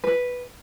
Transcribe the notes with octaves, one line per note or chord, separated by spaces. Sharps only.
B4